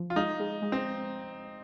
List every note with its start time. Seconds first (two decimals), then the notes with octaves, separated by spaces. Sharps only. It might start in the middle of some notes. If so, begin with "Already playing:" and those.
Already playing: F3
0.10 F4
0.16 G#3 D#4
0.40 G#3
0.62 G#3
0.72 C4